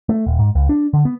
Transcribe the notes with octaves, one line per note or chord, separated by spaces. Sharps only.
A3
D#1
G#2
C#2
D4
D3
B3